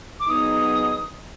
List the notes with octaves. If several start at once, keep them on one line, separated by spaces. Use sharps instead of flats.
D6
F#3 B3 D#4 G#4 D#6